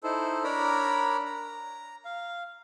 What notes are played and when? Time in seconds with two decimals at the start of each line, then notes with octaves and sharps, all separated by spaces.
0.03 D#4 E4 A4 C5
0.44 D4 A#4 C#5 D5 A#5 B5
1.25 A#5
2.05 F5